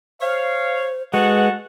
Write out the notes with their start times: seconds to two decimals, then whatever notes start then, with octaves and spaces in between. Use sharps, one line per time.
0.21 C5 C#5 F5
1.14 G#3 F#4 A4 B4 F#5